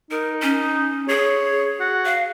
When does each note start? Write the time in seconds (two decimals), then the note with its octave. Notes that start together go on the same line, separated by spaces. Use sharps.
0.11 D#4 A#4
0.42 C#4
1.08 G#4 C#5
1.80 F#4
2.05 F5